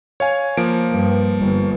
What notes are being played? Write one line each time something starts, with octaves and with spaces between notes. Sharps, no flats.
C#5 F5 G#5
F3 A#3 D7
G2
G1